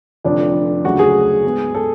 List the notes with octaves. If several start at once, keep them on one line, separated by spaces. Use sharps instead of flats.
F1 F2 D3 F3 D4
D2 C#3 F#3 C#4 F#4
G#4
G#2 G#3 B3
A4